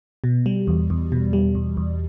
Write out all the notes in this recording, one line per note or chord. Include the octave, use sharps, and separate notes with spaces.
B2
G3
E2
E2
B2
G3
E2
E2